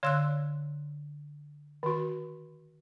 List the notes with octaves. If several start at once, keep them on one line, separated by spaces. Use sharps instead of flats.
D3 C#5 F5 C6 E6 F#6
D#3 F#4